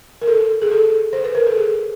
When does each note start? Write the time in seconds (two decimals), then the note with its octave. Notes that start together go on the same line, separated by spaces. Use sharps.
0.22 A#4
0.27 A4
0.62 G#4
0.72 A4
1.13 C5
1.24 B4
1.35 A#4
1.47 A4
1.57 G#4